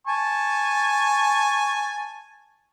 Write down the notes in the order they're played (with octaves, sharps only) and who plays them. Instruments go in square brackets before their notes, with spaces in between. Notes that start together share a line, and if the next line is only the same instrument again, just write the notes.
[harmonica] G#5 A5 C#6